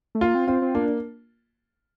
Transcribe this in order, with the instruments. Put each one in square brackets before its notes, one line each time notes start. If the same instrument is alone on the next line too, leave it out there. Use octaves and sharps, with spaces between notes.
[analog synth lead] A3
[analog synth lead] A#3 [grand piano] F4
[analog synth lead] C4
[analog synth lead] C4 [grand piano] F4
[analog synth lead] C4
[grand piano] A#3 [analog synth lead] D4